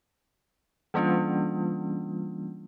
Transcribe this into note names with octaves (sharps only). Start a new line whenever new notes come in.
E3 G3 A#3 C#4 D4 F4